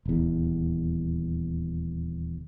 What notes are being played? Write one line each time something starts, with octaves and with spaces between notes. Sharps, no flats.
D#1 E2